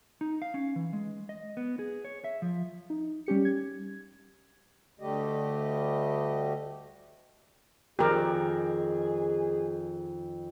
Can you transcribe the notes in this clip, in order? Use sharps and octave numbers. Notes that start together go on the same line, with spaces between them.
D#4
F5
C#4
E3
G#3
D#5
B3
G#4
C#5
E5
F3
D#4
G3 C#4 G4 C#7
G#6
D2 D3 G3 A3 G4 D#5
F2 D#3 G4 G#4 A#4